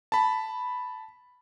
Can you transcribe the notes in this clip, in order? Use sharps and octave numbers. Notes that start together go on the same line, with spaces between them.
A5 B5